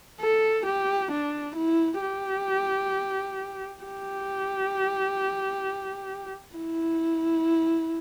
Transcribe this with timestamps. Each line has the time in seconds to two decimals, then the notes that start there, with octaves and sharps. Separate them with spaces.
0.20 A4
0.66 G4
1.11 D4
1.56 E4
2.01 G4
3.83 G4
6.55 E4